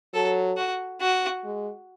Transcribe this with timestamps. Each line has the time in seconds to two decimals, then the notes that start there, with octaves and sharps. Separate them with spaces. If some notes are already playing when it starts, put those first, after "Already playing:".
0.14 F#3 A4
0.57 F#4
1.00 F#4
1.44 G#3